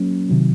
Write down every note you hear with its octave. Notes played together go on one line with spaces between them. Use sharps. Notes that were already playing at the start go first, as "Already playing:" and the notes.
Already playing: F#3 A#3 C#4
C3 D#3 F#3